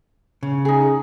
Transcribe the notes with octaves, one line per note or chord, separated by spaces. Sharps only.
C#3
D#4 G#4